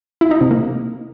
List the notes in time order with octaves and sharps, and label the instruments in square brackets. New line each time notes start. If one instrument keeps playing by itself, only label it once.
[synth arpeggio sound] E4
D#4
C3
A#3